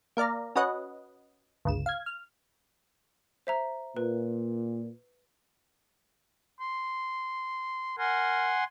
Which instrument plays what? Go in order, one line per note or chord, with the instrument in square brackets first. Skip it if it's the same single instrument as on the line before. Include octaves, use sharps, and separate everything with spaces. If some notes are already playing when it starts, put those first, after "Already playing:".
[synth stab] A#3 A#4 D5 F5 A#5
C#4 F#4 B4 D#5 F#5
G1 C#2 E7
F5 G#6
F6
[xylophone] C5 E5 A#5
[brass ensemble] A#2 [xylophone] B4
[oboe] C6
[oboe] A#4 [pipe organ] F#5 G#5 C6